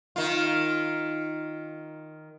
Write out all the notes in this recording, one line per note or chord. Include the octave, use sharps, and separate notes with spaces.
D#3 F4